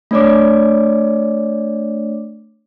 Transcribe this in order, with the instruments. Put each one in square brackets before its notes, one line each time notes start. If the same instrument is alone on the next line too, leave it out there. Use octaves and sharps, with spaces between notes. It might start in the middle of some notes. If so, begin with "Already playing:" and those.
[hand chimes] A3 D4 C#5 D5 D6